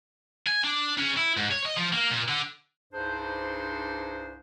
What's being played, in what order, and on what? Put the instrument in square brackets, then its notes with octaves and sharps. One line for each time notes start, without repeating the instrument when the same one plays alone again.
[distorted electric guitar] G#5
D4
C#3
E4
G#2
C#5
D#5
F3
A#3
A#2
D3
[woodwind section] C2 G2 D4 D#4 G#4 C5